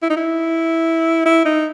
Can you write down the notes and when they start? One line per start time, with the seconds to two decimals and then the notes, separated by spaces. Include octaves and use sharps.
0.02 E4
0.10 D#4
0.17 E4
1.25 E4
1.45 D#4